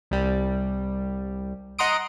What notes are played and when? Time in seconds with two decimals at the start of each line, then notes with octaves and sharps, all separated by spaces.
0.11 C2 G3
1.79 D#5 F#5 A#5 C6 D#6 D7